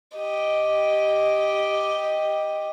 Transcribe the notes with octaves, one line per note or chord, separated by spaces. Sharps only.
G4 D#5